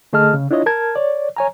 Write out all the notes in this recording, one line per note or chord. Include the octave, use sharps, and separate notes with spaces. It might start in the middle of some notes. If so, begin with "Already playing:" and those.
D3 A3 G#4 D#5 A5 F6
C#3
D4 E4 F4 C#5 D#5
A#4 A5 G#6
C#5 D5
C#5 G#5 A#5